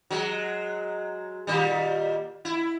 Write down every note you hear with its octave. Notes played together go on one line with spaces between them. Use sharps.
F#3 G#3
A#2 D#3 G3
E4